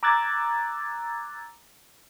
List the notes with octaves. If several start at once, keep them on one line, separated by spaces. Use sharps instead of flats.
A#5 D6 E6 F#6 G#6 A6